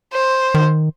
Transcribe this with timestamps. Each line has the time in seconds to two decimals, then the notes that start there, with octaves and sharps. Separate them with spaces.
0.13 C5
0.54 D#3